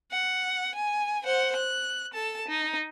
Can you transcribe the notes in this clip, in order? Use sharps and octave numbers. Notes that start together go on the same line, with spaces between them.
F#5
G#5
C5 F#5
F#6
A4 A5
D#4